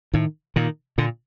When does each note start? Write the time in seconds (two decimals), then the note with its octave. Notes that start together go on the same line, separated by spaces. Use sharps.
0.14 A2 D#3
0.56 A#2 D#3
0.98 A#2 D3